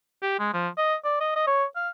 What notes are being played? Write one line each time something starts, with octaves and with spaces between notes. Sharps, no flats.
G4
G#3
F3
D#5
D5
D#5
D#5
C#5
F5